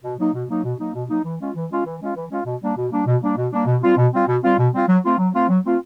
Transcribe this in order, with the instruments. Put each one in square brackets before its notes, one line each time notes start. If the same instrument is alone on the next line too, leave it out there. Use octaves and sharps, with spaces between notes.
[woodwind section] B2
F#3 A#3 D#4
B2
F#3 A#3 D#4
B2
F#3 A#3 D#4
B2
F#3 A#3 D#4
E3
G#3 C#4 F4
E3
G#3 C#4 F4
E3
G#3 C#4 F4
E3
G#3 C#4 F4
B2
G3 A#3 D4
B2
G3 A#3 D4
B2
G3 A#3 D4
B2
G3 A#3 D4
B2
G3 C4 F4
B2
G3 C4 F4
B2
G3 C4 F4
B2
G3 C4 F4
F#3
A3 C4 F4
F#3
A3 C4 F4
F#3
A3 C4 F4